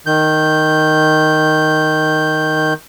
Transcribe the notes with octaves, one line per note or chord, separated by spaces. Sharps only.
D#3 G6